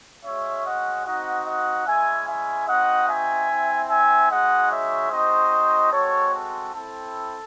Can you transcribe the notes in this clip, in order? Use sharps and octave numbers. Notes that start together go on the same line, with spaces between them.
G#3 C#4 F#4 C#5 E5
D#5 F#5
C4 D#4 F#4 D#5 F#5
D#5 F#5
G#3 C#4 E4 E5 G#5
E5 G#5
C4 D#4 F#4 D#5 F#5
E5 G#5
C4 E4
E5 G#5
G#3 D#4 F#4 D#5 F#5
C#5 E5
C4 D#4 F#4 C5 D#5
G#3 C4 F#4 A4 C#5
A4
C4 E4 A4